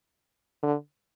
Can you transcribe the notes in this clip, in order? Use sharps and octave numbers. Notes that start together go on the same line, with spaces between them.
D3